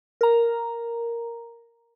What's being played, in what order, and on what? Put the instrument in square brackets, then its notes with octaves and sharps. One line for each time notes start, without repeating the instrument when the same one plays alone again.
[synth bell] A#4 A#5